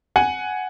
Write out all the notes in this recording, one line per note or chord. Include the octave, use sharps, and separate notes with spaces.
F#5 G#5